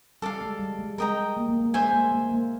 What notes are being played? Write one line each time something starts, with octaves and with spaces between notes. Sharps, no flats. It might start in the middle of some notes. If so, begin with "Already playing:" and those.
G3 A4 D5 F5
G#3
G3
G#3
G#3 A#4 D#5 G5 A#5
A#3
A#3
A#3
G#3 C5 E5 G#5
A#3
A#3
A#3